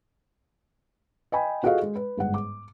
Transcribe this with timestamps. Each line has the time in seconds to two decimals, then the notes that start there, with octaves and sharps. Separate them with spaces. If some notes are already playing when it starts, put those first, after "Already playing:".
1.32 D#5 G5 G#5 B5
1.63 F4 F#4 G#4 A4 D#5 F5
1.82 G#3
1.96 B4
2.17 G1 G#2 F#5
2.34 D6